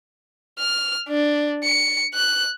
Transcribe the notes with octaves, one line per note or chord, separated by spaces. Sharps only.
F6
D4
C#7
F#6